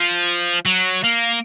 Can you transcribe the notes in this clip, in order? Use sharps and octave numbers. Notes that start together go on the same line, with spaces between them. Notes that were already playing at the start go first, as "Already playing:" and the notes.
Already playing: F3
F#3
A#3